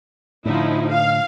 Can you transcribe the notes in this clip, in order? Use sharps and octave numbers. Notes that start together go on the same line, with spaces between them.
A2 D3 F3 D#4 E4
F5